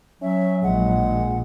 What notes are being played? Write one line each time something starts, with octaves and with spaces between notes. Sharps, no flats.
F#3 C#4 E5
A#1 A#2 G#3 F#5